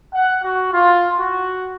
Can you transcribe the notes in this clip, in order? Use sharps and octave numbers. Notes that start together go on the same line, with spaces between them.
F#5
F#4
F4
F#4